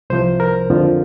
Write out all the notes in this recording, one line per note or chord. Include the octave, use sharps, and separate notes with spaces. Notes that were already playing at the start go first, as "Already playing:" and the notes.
C2 C3 F3 C5
A#4
F2 D3 F3